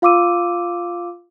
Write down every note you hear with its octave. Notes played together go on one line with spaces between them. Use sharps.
F4 F5 C6 D6 E6 D#7